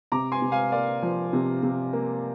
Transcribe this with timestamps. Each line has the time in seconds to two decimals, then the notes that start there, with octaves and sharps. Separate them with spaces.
0.12 C3 A#5 D6
0.32 G#5 C6
0.42 C3
0.52 F5 G#5
0.72 A#3 D5 F5
1.02 F3
1.33 C3
1.63 C3
1.93 A#3